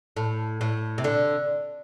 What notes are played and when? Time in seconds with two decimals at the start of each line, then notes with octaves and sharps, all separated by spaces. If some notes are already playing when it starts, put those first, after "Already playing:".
0.17 A2
0.61 A2
0.98 C3
1.04 D3